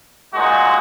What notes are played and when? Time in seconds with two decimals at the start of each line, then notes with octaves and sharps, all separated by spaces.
0.33 A#2 G#3 D#4 F#4